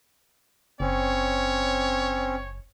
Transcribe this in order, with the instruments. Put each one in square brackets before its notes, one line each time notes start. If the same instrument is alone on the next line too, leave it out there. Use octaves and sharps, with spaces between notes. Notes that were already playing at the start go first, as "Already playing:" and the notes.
[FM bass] F#1 [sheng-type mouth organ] C4 C#4 [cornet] C#5